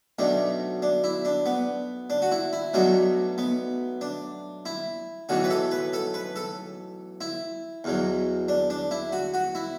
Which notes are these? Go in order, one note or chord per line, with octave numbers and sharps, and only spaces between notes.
B1 B2 A3 D4
D4
E4
D4
B3
D4
F#4
E4
E4
B1 B2 F#3 A3 D4
B3
D4
E4
B1 A2 E3 F#4
B4
A4
B4
A4
B4
A4
E4
E2 B2 F#3
D4
D4
E4
F#4
F#4
E4